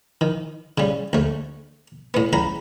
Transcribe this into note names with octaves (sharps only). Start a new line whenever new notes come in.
D#3
C#3 G3
D2 A3
A2 B3
C#2 A#5 B5